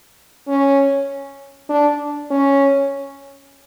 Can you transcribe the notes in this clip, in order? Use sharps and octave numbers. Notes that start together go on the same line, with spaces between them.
C#4
D4
C#4